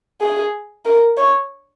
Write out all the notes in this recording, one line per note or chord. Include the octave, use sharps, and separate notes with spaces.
G#4
A#4
C#5